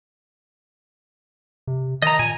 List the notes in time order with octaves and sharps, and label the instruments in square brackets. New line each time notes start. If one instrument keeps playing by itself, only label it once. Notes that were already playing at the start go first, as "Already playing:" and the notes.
[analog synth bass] C3
[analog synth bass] D#3 [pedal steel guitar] D#5 A#5
[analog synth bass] A#2 [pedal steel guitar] G#5